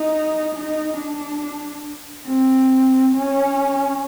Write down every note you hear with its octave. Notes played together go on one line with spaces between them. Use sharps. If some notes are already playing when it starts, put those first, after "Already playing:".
Already playing: D#4
D#4
D4
C4
C#4